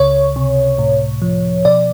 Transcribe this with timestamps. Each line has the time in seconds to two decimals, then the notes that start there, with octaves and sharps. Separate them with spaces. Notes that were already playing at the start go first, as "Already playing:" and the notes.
Already playing: C#2 C#3 C#5
0.36 C3
0.79 A2
1.22 F3
1.65 B2 D5